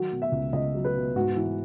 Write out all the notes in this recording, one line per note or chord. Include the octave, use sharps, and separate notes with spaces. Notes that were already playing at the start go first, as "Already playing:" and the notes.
Already playing: D#3 F#3 F#4
B2
E5
C#2
C#2 D#5
F#3
B4
B2
G#2 F#4
E3